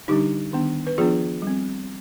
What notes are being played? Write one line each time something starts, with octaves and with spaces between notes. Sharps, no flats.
D3 G3 D4 D#4 G4
D#3 B3 D4
B4
F3 B3 D4 F4 G#4
G3 C4